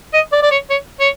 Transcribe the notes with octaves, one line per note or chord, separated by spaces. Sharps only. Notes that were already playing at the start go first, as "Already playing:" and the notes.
D#5
D5
D5
C#5
C#5
C#5